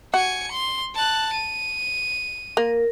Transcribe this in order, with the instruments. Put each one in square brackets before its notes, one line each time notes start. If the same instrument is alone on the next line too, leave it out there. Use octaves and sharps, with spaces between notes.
[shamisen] F#4 [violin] G#5 C#7
[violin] C6
A5 F#6
D#7
[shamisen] A#3 [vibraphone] A#4